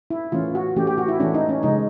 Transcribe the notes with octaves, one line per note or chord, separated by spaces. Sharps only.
E4
E3 A3 C#4 F4
F#4
E3 A3 C#4 G4
G4
F#4
E4
E3 A3 C#4 D4
D#4
C#4
C#3 F3 G#3 D#4